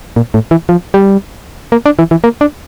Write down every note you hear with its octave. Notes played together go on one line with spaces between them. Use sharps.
A#2
A2
E3
F3
G3
A#3
D4
E3
E3
A#3
D4